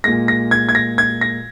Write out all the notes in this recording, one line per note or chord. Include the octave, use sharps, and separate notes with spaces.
A#2 G#3 A#6
A#6
G#6
G#6
A#6
G#6
A#6